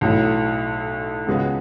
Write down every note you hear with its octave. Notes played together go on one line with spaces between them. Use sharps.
B1 A2 F#3
C#2 C#3 G#3 B3 F#4